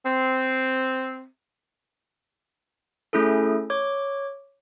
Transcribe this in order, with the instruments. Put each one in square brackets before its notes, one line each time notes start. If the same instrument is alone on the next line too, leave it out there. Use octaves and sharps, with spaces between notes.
[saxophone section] C4
[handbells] A3 C#4 E4 G#4 A4
C#5 D6